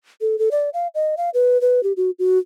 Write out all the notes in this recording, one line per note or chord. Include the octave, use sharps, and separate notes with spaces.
A4
A4
D5
F5
D#5
F5
B4
B4
G4
F#4
F#4